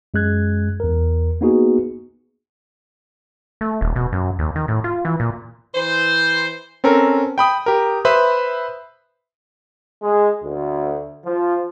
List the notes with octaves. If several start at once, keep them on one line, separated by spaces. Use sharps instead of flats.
F#2 G#3 G#4 F#6 G#6
E2 A#4
A#3 B3 D#4 F#4 G#4
A3
D#1
B2
F#2
D#2
D#3
A2
F4
E3
A#2
E3 C5
C4 C#4 A4 A#4
G5 B5 D#6
G4 A#4
B4 C5 E5 B5
G#3
D2
F3